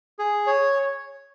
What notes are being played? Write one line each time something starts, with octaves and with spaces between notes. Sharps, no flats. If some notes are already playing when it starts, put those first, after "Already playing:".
G#4
C#5